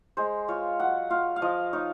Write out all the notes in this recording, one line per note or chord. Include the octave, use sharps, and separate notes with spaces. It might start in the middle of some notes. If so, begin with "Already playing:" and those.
G#3 C5
F4 C#5
F#3 F#5
F4 F5
F5
F3 D#5
D#4 C#5